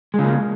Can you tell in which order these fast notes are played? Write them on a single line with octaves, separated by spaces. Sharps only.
G#3 C#3 A#3